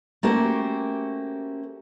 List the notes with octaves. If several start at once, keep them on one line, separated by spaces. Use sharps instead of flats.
A3 A#3 C#4 F#4 G4 C5